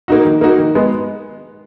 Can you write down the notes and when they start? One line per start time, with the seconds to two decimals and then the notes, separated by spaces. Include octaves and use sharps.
0.08 A#3 D#4 F#4
0.25 D#3
0.41 A#3 D#4 F#4
0.58 D#3
0.75 G#3 B3